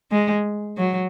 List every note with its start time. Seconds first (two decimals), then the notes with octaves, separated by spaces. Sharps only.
0.12 G#3
0.77 F#3